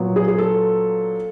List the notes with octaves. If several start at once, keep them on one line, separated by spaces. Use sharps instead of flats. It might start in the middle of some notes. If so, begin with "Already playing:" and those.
Already playing: A#2 F#3 B3
G#4
G#4
A4